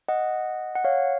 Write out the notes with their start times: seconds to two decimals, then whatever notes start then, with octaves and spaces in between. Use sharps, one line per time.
0.09 D#5 F#5
0.75 F#5
0.84 C#5 F5